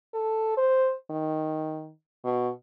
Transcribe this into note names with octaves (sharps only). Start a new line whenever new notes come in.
A4
C5
D#3
B2